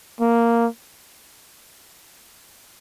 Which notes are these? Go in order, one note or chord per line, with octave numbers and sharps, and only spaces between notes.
A#3